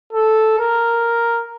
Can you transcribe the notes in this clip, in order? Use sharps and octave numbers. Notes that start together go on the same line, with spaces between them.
A4
A#4